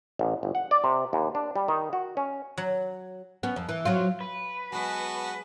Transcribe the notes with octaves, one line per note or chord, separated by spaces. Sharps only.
A1
G1
F#5
D5
C3
D#2
D4
G3
D#3
F#4
C#4
F#3
B3 C#4
F2
E3
F#3 C4 F4
B4
F#3 G#3 B3 F#4 A5